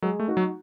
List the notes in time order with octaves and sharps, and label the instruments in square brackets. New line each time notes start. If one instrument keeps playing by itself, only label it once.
[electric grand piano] F#3 [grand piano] G#3
[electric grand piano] A3
[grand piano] D#4 F#4
[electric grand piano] F#3